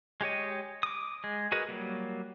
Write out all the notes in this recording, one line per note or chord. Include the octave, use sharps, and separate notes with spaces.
G#3 G4 C#5 D#5
D6 D#6
G#3
F#4 G#4 A#4 B4 D#5
F#3 G3 A#3